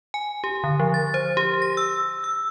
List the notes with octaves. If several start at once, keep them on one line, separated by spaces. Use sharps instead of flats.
G#5
G4
D3
F3
A6
C5
G4
A#6
E6
E6